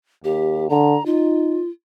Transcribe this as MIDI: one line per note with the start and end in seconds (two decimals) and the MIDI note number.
0.24 0.67 39
0.24 0.67 67
0.70 0.97 50
0.70 1.05 82
1.06 1.61 63
1.06 1.69 65